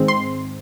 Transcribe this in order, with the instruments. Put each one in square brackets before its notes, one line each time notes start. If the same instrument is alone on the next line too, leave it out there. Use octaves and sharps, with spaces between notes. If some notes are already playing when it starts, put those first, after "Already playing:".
Already playing: [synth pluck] G#2 D#3 G#3 C4
C6